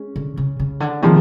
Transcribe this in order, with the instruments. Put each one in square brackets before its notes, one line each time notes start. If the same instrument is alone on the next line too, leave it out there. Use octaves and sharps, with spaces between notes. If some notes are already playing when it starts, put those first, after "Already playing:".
Already playing: [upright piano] G#3 C#4
[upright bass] D3
C#3
C#3
D3
[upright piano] C3 F3 G#3 [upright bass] D#3